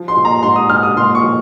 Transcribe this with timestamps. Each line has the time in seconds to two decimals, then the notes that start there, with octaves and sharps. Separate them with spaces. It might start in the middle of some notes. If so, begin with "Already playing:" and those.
Already playing: F3
0.08 C6
0.16 A#2
0.25 A#5
0.42 G#2 C6
0.56 D#6
0.69 G#2 F6
0.83 D#6
0.97 A#2 C6
1.15 C#6
1.23 F3